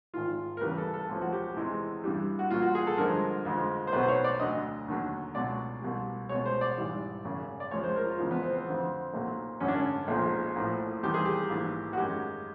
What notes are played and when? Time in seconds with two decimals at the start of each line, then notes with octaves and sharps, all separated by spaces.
0.13 G#1 G#2 D#3 F4
0.57 A#4
0.61 E2 C#3 E3 G3 B4
0.78 A4
0.94 A4
1.09 C#2 C3 F3
1.21 F#4
1.33 G4
1.56 E2 C3 E3 G#3
2.04 G2 E3 G3
2.39 F#4
2.51 C2 A#2 F#3 F4
2.62 F#4
2.75 G#4
2.87 A4
2.98 G2 D3 F3 G#3 A#4
3.45 F2 D3 F3 G#3
3.87 C5
3.93 B1 B2 F#3 B4
4.03 C5
4.09 C#5
4.24 D5
4.40 D2 D3 F#3 D#5
4.88 D#2 D3 F#3
5.35 C#2 B2 F#3 D5
5.82 C2 B2 G3
6.29 C#2 B2 G#3 C#5
6.46 C5
6.61 D5
6.77 G#1 G#2 E3 G3
7.25 G#1 F#2 C#3
7.60 D5
7.71 C#2 C3 F3 G#3 C#5
7.83 C5
7.96 A#4
8.07 F4
8.18 E2 C#3 F3 G#3
8.31 B3
8.43 C4
8.55 C4
8.66 F2 D3 F#3
9.14 B1 A#2 F#3
9.60 G#1 F#2 D3 F#3 C#4
9.68 D4
9.75 C#4
10.08 B1 A#2 F3 G#3
10.56 A#1 A2 F3
11.03 E2 C3 D#3 G3 G4
11.14 G#4
11.25 G4
11.50 A#1 G#2 E3
11.93 F#4
11.97 F#2 D#3 G#3 G4